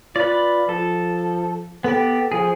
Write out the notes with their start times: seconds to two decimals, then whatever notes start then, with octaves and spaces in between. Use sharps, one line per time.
0.16 F4 B4 D5
0.69 F3 A4
1.84 B3 G4 A4
2.32 F3 G#4